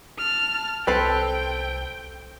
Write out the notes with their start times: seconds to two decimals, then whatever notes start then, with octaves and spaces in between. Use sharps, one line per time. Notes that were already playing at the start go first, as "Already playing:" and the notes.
0.18 A5 F6
0.87 C2 C4 A4 B4 G5